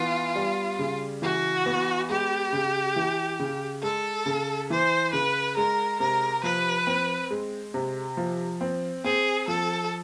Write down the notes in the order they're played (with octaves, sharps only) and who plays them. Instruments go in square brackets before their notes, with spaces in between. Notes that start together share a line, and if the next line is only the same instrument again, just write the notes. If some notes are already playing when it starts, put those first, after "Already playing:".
Already playing: [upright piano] E3 B3 [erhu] F4
[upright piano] G3
C#3
[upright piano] E3 [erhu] F#4
[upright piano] B3
[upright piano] G#3 [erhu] G4
[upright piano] C#3
E3
C#3
[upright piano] G#3 [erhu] A4
[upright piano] C#3
[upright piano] E3 [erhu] C5
[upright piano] C#3 [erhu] B4
[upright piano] G#3 [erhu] A#4
[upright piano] C3 [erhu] A#4
[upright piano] F3 [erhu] B4
[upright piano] C4
G#3
C3
F3
C4
[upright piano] C4 [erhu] G#4
[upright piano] F3 [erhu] A4